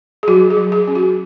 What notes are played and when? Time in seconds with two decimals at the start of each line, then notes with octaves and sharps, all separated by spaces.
0.23 G#4
0.28 F#3 F#4
0.50 G#4
0.57 F#3
0.72 G#4
0.88 C#4
0.95 F#4